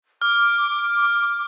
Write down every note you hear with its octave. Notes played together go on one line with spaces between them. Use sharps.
D6 F6